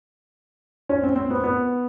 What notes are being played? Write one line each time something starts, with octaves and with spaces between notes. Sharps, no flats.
C#4
C4
C4
B3
B3